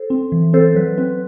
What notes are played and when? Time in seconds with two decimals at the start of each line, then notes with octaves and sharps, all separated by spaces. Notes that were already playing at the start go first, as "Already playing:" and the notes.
Already playing: A4 C5
0.10 C4
0.32 E3
0.53 C4 A4 C5
0.75 F#3 B4
0.98 C4 B4